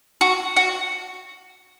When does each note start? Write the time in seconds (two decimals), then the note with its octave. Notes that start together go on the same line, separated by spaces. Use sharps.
0.21 F#4
0.56 F#4